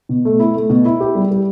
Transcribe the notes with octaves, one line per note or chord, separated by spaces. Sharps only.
B2
A3
E4
A3
B2
E4
G4
G3
G4